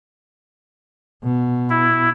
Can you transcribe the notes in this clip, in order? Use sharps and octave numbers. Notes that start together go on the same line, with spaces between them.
B2
E4